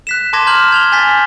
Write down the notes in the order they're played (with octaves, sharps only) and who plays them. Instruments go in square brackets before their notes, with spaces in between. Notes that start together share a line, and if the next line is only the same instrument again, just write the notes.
[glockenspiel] F#6 B6 E7
A5 C6 D6 G#6 A#6 E7
A#5 F6 G6 F#7
G#6 F7 G7
G#5 G6 A6 B6